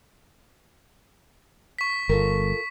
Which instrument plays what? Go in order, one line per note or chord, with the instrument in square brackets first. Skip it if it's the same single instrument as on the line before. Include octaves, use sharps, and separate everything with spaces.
[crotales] C#6 B6
[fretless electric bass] G1 [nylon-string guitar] F4 A4 A#4